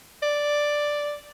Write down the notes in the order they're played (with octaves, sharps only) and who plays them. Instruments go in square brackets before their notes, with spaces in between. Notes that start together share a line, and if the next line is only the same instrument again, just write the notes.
[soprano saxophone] D5